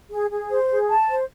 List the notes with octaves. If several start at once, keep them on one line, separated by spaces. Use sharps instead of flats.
G#4
G#4
C5
G#4
A5
C5